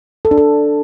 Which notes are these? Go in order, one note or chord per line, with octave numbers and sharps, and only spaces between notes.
A4
D4
A4